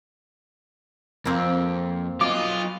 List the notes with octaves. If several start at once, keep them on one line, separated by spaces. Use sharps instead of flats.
F2 A#3 C4
F#3 F4 D#5 D6